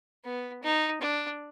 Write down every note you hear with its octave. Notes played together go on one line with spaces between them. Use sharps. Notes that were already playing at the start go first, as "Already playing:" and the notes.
B3
D#4
D4